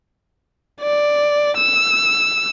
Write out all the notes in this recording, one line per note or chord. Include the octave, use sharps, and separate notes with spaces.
D5
E6